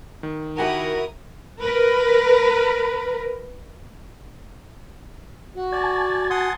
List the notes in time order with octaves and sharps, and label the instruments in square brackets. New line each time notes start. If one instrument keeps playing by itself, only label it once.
[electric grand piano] D#3
[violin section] E4 A#4 D#6 [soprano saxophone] F#4 [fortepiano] G4 F#5 G#5
[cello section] A#4 B4
[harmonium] F#4
[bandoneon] D5 [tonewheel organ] G#5 A5
[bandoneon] F#5 C6 D#6